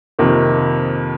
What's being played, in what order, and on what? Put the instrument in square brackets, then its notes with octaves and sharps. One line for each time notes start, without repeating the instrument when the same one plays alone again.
[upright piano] F2 C3 D#3 A#3